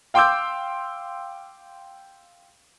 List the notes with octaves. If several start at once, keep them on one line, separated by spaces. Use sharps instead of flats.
F5 G5 C6 D6 E6 G6